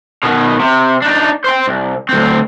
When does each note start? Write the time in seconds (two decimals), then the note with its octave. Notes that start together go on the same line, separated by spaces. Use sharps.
0.23 B2 D#3
0.60 C3
1.02 D4 D#4
1.44 C5 G5
1.67 C2
2.09 D2 C4